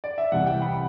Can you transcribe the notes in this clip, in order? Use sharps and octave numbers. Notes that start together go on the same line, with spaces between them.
D5
E5
C2 C3 E3 F#5
G5
B5